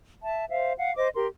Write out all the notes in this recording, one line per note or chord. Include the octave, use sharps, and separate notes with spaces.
E5 A5
C5 E5 F5
F5 F#5
C5 D#5 D6
G4 A#4 C6